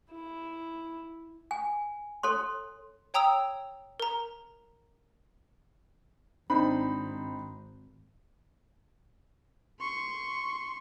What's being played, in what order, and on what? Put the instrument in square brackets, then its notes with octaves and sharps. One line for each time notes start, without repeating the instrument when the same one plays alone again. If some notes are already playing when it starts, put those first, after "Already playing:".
[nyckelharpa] E4
[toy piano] G#5
A4 C#5 C6
[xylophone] C#5 G5 A#5 D#6 E6 F7
A#4 A#5
[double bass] G#1 [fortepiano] C4 D4 D#4 [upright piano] B5
[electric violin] C6 C#6